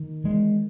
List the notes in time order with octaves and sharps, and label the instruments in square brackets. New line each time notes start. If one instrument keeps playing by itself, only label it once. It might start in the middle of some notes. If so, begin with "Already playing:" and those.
Already playing: [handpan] D#3
[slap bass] E3 G#3